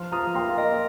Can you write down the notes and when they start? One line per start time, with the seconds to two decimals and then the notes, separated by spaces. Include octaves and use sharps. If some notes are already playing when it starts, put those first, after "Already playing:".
Already playing: F3 C6
0.12 F4 A#5 D#6
0.35 A#3 G5 C6
0.49 F5
0.58 A#4 D#5